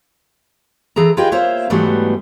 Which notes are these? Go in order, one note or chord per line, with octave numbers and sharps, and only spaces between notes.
E3 G#4 A4 A#5
F4 G4 G#4 B4 D#5 G5
A#3 F4 C5 C#5 E5
G#2 E3 F#3 G3 A3 B3